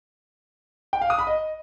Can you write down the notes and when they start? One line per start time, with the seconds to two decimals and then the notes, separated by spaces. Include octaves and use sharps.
0.93 G5
1.01 F5
1.10 D#6
1.19 B5
1.27 D#5